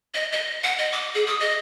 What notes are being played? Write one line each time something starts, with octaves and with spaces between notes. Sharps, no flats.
D#5
D#5
F#5
D#5
D6
G#4
D#6
D#5